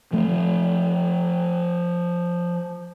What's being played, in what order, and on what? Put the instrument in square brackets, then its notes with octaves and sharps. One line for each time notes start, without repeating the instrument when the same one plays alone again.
[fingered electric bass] F3 A3